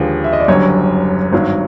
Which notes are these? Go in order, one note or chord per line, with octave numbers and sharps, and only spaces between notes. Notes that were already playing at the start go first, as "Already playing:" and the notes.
Already playing: D#2 D3 F3 G#3 B4
E5
D#5
D5
F#1 F#2 D3 G3 C#5
G#1 G2 D#3 F#3